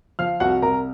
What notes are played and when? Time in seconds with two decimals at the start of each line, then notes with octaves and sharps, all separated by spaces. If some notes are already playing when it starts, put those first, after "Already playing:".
0.19 F3 F5 F6
0.40 C2 F#4 F#5
0.62 C2 A#4 A#5